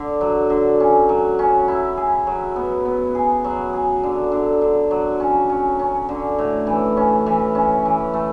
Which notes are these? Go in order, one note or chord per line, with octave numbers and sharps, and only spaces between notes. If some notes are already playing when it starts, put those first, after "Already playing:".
Already playing: D3
F#3
D3
C#4
F#3
C#4
E4
G#4
F#3
B3
B3
G#4
F#3
G#4
D3
D3
D3
F#3
C#4
C#4
C#4
D3
A2
E3
C#4
E3
C#4
E3
A3